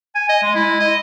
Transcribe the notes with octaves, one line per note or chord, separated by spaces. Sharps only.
G#5
D#5
G#3
E4
D#5